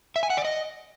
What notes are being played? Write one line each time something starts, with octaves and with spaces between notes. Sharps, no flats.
E5
G#5
F#5
D5
D#5